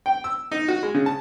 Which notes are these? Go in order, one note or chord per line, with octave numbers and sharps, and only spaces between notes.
G5
E6
D#4
F#4
G#3
C#3
A5